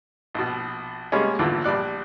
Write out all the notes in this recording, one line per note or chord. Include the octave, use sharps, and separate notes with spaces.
A#1 B2
C3 G3 G#3 A#3 B3 C#4
G#1 E2 A#2 D3 E3
A#1 G3 D5 F#6